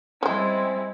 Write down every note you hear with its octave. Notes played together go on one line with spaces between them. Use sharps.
G3 G#3 C4 C#4 E4 C5